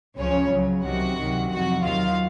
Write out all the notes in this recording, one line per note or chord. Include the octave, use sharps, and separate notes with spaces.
C#2 C#3 F3 C#4 C#5
C#2 C#3 F#3
C2 C3 D#3 F#3 F#4 F#5
C#2 C3 D#3 F#3
F2 C3 F#3 F#4 F#5
D#2 D#3 F#3 F4 F5